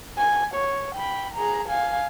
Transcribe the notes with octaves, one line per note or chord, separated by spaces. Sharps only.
G#5
C#5
G5 B5
G#4 A#5
F5 G#5